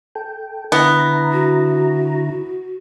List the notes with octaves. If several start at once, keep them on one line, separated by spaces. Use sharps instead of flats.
A4 G5
D3 B3 E4 A#5
F#4